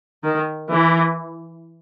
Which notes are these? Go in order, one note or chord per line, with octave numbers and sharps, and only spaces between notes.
D#3
E3